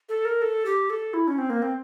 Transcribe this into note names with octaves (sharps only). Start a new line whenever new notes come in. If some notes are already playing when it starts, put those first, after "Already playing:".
A4
A#4
A4
G4
A4
E4
C#4
C4
A#3
C4